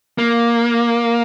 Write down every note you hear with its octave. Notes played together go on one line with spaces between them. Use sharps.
A#3